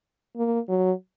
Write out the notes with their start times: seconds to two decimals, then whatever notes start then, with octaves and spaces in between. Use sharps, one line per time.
0.36 A#3
0.69 F#3